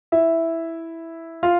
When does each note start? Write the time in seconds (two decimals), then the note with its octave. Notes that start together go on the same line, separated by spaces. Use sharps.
0.12 E4 E5
1.43 F4 F5